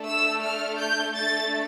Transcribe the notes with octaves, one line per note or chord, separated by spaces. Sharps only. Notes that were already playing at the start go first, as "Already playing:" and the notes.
Already playing: A3 D4 A4
E6
F6
G6
A3 D4 A4 A6